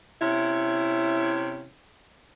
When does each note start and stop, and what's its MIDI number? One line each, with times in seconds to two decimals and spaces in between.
0.22 1.66 48
0.22 1.66 61
0.22 1.66 64